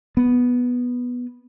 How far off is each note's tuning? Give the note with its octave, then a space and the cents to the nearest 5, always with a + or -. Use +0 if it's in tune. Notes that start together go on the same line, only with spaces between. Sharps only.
B3 -5